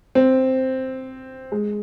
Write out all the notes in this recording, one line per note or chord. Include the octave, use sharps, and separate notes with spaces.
C4
G#3